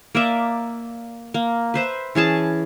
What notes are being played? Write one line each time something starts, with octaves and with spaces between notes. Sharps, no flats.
A#3 D5 E5
A#3
B4 C5 E5
E3 C#4 G#4 A5